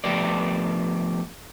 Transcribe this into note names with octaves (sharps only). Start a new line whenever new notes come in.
F3 A3 B3 G4 A#4 D5